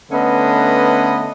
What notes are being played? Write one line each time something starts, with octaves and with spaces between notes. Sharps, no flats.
D3 A3 B3 C#4 B4 D#5